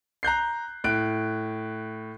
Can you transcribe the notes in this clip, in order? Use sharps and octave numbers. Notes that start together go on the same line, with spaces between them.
A#5 F#6 G6 C7
A2 F#6 D7